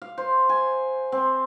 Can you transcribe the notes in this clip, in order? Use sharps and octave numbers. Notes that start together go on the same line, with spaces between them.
F5
C5
G#5
C4